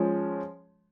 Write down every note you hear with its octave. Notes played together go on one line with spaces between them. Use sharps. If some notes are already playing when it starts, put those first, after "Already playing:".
Already playing: F3 G#3 C#4